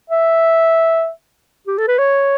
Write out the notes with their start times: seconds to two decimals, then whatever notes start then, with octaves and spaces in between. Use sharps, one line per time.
0.10 E5
1.67 G4
1.78 A4
1.88 B4
1.98 C#5